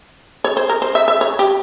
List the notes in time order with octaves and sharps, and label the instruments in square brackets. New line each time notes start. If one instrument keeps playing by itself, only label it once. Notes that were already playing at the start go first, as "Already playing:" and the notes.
[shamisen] C#5
C5
A#4
C5
E5
E5
C#5
G4